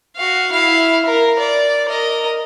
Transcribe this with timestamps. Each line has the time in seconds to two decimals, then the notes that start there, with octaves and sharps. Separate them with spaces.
0.16 F#4 F5
0.52 E4 F5
1.06 A#4
1.40 D5
1.89 A#4 D#5